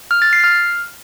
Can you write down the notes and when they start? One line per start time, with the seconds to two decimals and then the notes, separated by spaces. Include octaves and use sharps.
0.11 F6
0.22 A6
0.33 C7
0.44 F6